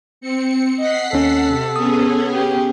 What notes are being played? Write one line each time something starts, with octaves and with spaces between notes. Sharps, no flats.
C4 C#7
D#5 F#5 B6 C7
D#2 C#4 A4
C3
B3 C#4 G#4 D#6
G4